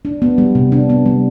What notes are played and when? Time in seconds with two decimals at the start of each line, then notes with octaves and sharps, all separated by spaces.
0.05 D4
0.22 B3
0.38 G3
0.55 C3
0.72 D4
0.89 B3
1.06 G3